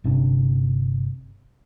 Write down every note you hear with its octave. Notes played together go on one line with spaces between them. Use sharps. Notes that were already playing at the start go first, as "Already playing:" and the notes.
G1 C3 D4